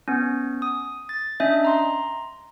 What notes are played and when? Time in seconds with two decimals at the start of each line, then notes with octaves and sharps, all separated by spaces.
0.08 B3 C#4
0.62 D#6
1.09 A6
1.40 C#4 D4 D#5 E5
1.65 A#5 C6